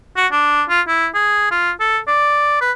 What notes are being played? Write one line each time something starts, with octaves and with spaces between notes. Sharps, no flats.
F#4
D4
F4
E4
G#4
F4
A4
D5
B4